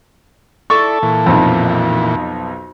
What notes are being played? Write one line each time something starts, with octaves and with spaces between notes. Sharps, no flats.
E4 A4 D5 C#6
A#2 E3
B1 F2